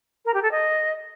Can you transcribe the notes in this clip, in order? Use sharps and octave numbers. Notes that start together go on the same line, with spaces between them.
A#4
G4
A4
D#5